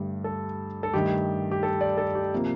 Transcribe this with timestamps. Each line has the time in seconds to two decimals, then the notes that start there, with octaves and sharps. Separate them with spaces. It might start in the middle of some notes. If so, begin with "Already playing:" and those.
Already playing: G2 D3 A3 G4
0.24 A4
0.83 A4
0.94 G2 D#3 A3 G4
1.51 G4
1.63 A4
1.81 D5
1.98 A4
2.15 G4
2.34 C3 F3 A#3